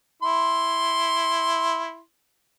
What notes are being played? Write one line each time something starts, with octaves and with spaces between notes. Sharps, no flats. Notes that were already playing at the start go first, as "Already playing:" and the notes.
E4 C6